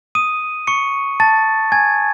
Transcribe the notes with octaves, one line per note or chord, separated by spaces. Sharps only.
D#6 D#7
C#6 C#7
A5 A6
G#5 G#6